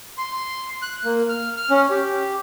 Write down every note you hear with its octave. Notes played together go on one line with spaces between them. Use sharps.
C6
F#6
A#3
F6
F6
C#4
G4